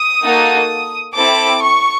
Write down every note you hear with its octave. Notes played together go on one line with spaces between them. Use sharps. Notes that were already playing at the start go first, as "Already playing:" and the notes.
Already playing: D#6
A#3 D#4 F#4 A4
C4 E4 A4 D6
C#6